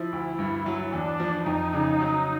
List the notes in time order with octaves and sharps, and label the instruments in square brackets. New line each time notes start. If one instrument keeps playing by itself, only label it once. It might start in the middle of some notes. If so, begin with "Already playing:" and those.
Already playing: [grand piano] F3 [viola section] E4
[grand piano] D2
G2
F#3
[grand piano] E2 [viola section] D4
[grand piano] F3
[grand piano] F2 [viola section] D#4
[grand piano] C#3
F#3